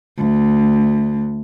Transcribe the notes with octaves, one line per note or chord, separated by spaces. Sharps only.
D2